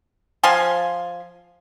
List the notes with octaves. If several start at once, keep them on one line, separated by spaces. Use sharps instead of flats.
F3 F5 G#5 C6